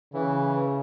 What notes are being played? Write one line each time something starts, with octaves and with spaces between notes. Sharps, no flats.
C#3 E3